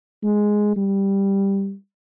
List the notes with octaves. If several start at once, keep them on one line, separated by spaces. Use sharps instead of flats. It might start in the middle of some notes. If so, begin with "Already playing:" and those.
G#3
G3